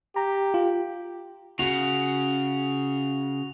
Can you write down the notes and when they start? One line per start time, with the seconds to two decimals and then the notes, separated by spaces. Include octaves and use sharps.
0.16 G4 A#5
0.54 F4
1.59 C#3 F#4 F7